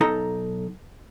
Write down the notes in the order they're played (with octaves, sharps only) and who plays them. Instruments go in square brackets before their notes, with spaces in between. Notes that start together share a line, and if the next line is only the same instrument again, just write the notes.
[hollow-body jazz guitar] B1 D#4 A4 A#5